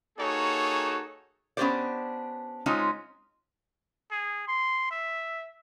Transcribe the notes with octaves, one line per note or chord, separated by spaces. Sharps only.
A#3 D#4 F#4 G#4 A4 C#5
B3 C#4 D4 G4 C5 D5
G#3 C4 C#4 D#4 F4
G#4
C6
E5